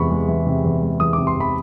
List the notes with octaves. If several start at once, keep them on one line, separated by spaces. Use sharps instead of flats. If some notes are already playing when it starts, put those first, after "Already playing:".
Already playing: E2 C3 E3 G#3 B5 C#6
G#3
E3
C3
E2
G#3
E3 D#6
C3 D6
C6
E2 B5